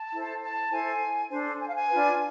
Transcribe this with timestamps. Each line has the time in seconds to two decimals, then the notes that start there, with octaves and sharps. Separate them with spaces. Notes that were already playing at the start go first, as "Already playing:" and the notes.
Already playing: A5
0.13 E4 A4 C5
0.43 A5
0.71 E4 A4 C5 G#5
1.30 D4 A4 C5
1.60 G#5
1.68 F5
1.75 G#5
1.88 D4 F4 B4